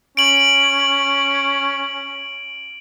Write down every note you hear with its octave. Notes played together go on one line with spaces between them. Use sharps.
C#4 D7 F#7